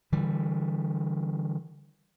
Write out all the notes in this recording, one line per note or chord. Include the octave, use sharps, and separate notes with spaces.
D3 E3 G3